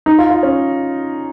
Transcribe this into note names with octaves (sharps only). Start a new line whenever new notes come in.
D#4
F4
F4
C#4